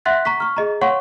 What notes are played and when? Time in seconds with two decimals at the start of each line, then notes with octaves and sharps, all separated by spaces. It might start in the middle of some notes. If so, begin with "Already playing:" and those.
0.05 E5 F#5 C6 F#6 A6 B6
0.25 A#5 C#6 B6
0.40 C#6 F6
0.56 G#4 D#5 A#5
0.81 C#5 F5 F#5 C6 C#6